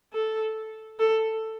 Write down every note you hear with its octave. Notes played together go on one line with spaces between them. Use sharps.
A4
A4